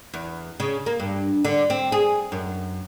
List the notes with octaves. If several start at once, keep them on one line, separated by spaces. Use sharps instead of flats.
E2
C#3
A#3
G2
D3
C4
G#4
F#2